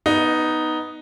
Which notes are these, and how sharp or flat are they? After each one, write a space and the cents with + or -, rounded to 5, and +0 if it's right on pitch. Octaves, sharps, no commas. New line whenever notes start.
B3 +0 D#4 +0